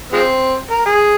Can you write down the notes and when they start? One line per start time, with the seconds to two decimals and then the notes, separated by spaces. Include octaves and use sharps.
0.13 F3 G#3 C4
0.71 A#4
0.86 G#4